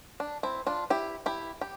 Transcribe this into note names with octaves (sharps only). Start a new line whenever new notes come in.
D4
C4 E4
D4 F4
E4 G4
E4 G4
G4